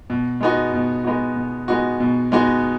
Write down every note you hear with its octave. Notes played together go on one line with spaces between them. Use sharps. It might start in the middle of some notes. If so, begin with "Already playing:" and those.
B2
G#3 B3 D#4 F#4
B2
G#3 B3 D#4 F#4
B2
G#3 B3 D#4 F#4
B2
G#3 B3 D#4 F#4